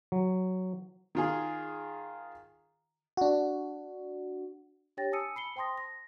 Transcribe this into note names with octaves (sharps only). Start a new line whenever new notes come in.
F#3
D#3 F4 G#4
D4 F#4
D4 G4 C#5 G5 A6 A#6
G#5 A5 D#6 E6 C#7 D#7
B5 C7 C#7 G7
C5 G5 A5 C6 D#6 A#6
A#6